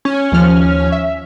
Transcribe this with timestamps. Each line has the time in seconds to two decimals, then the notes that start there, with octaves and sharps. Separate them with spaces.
0.05 C#4
0.32 D#2 F3 F6
0.92 E5